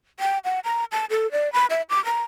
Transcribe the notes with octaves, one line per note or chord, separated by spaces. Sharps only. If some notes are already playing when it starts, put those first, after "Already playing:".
G5
F#5
A#5
A5
A4
D5
B5
E5
D6
A#5